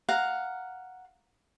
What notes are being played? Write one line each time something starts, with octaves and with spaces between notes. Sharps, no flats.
F5 F#5 A#5